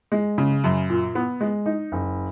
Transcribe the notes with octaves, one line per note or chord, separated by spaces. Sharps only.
G#3
C#3
F#2
A#2
B3
G#3
D#4
F#1